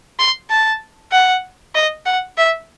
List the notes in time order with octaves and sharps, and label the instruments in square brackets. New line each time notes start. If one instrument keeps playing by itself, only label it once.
[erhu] C6
A5
F#5
D#5
F#5
E5